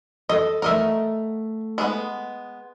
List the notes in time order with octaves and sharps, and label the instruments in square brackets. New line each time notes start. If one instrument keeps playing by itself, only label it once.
[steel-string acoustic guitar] A4 [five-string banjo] D#5
[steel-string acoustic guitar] A3 F#5 [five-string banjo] A#4 D#5 E5
[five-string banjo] G#3 B3